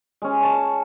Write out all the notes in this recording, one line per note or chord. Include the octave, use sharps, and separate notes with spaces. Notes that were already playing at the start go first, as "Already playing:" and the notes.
G#3 C#4
C#5 A5 C#6